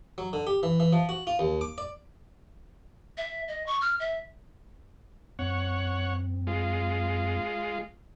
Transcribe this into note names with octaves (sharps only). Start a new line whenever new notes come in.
F#3
D3
G4
E3
E3
F3
F#4
F4
D#2
D6
D5
E5
D#5
C#6
F6
E5
F#2 C4 C#5 F#5
G#3 F4